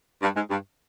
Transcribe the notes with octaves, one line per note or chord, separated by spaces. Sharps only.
G2
G#2
G2